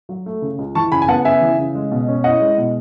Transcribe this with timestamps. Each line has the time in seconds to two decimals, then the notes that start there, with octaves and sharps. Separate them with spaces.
0.09 F#3
0.26 A3
0.42 C#3
0.59 C#2
0.75 E3 A5 C#6
0.92 C#3 G#5 B5
1.02 G#5
1.08 B3 F#5 A5
1.25 C#3 E5 G#5
1.41 E3
1.58 C#3
1.75 G#3
1.91 B2
2.08 C#4
2.24 E4 D#5 F#5
2.41 G#3
2.58 B2